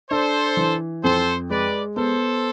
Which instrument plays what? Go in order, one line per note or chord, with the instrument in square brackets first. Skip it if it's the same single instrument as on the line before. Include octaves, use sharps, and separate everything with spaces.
[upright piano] D4 [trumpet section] A4 C5
[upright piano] E3
[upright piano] F2 [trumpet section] A4 C5
[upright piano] G#3 [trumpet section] B4 D5
[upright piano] B3 [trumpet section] A4 C5